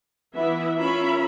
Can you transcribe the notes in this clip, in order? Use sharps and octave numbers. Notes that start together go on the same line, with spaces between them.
E3 B3 E4 E5
C#4 F4 A#4 E5 B5